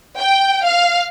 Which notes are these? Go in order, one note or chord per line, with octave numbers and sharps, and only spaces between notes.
G5
F5